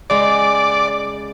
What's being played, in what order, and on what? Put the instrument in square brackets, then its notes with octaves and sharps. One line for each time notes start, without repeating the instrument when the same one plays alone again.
[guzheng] C#3 G#3 [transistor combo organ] D5